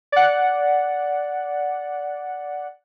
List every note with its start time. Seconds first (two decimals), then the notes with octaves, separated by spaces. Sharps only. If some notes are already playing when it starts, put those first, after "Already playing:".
0.12 D5 F#5